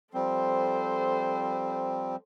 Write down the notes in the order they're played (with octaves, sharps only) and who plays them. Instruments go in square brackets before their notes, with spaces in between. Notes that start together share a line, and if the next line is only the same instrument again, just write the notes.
[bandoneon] F3 G3 C4 [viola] A4 C5